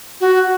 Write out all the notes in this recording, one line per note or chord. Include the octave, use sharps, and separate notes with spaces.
F#4